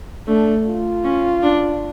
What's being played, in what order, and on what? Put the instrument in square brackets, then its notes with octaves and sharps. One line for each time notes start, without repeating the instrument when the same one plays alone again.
[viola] A3 [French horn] D4
[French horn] F4
[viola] C#4
D4